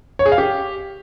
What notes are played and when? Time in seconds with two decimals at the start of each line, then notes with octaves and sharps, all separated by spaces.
0.19 C#5
0.26 G#4
0.32 F5
0.38 G4